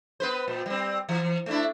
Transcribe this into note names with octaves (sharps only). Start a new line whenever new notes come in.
B3 B4 C5
A#2
G3 C4
E3
A3 D4 E4